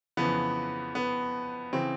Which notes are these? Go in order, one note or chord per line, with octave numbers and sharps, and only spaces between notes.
F2 C#3 E3 B3
B3
C#3 E3 C4